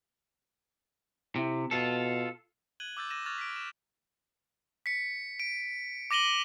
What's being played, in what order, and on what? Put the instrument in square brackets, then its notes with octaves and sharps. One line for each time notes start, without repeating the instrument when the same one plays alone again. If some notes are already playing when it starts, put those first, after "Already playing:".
[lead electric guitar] C3 [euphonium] E4
[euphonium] B2 [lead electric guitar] F4 A4
[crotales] F#6 G#6 D#7 F#7 G7
D6 E6 G6 A6
D6 E6 A6 A#6 D#7 E7
C#6 F6 F#6 G#6 A6 F7
B6 D7
E7
B6 C#7
D7
D6 A#6 D#7 F#7 G7